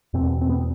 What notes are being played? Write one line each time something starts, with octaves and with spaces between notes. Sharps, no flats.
E2 B2 C4
C4
B3